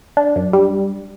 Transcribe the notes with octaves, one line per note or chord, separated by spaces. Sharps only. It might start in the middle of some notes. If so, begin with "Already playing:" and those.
D4
F#2
G3